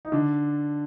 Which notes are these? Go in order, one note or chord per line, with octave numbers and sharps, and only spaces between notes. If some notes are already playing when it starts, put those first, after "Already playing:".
D#4
D3 D4